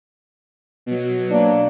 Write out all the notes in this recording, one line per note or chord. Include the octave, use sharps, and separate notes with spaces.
B2 F#3
A#3 D4